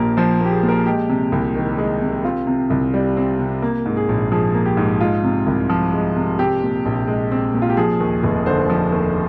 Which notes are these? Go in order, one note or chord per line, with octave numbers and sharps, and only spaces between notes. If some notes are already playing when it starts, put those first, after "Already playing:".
Already playing: A#1 A#2 A#3 G4 A#4
F3 C5
A#3 G4
G#4
A#2
A#4
G#3 G4
C3
C2
D#3
G#3
C3
C4 F4
C3
C2
G3
C4
C3
A#3
G#2
G#4
A#1
F3 G#4
A#3
G4
G#2
G#3 F4
C3
C2
F3
G#3
C3
C4 G4
A#2
A#1
G#3
C4
A#2
F4
G4
F3 G#4
D#2
F1
D3 C5
F3
D#2